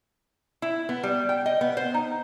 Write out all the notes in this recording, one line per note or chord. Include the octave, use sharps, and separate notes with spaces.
E4
B3
G3
G5
D#5
B3
C5
D#4